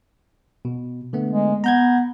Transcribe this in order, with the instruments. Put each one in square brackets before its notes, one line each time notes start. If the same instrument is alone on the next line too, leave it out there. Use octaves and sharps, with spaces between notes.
[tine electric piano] B2
D3 A3 B3
[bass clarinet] G#3
[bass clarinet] B3 [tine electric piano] A#5 G6 G#6